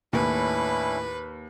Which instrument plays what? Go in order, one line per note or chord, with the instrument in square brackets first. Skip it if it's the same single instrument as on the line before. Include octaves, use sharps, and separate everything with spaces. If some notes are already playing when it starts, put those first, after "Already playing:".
[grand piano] D#2 [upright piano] A2 [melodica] C#4 D4 E4 [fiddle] B4